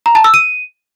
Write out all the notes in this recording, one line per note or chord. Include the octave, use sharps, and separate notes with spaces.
A#5
A5
E6
D#7